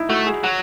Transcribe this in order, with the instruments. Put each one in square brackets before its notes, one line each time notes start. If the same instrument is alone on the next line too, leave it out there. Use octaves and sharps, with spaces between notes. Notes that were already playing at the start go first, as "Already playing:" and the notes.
Already playing: [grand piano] D#4 E4
[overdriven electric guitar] A3 [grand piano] F#4
[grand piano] G#4
[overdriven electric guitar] F#3 [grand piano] F#4